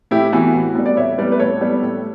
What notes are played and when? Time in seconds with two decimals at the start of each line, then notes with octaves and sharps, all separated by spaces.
0.11 A2 E4 G4
0.32 E3 B3 F#4
0.54 A2
0.75 G3 B3
0.86 D5
0.97 A2 C#5 E5
1.18 G3 B3 B4 D5
1.32 B4
1.39 A2 A4 C#5
1.61 G3 B3
1.82 A2